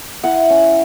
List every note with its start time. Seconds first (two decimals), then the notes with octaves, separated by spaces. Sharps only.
0.24 E4 F#5
0.50 C#4